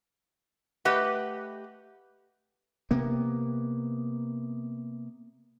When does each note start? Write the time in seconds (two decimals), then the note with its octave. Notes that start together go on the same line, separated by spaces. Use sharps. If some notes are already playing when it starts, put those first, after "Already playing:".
0.85 A3 G4 B4 D#5 F#5
2.91 C3 A#3 B3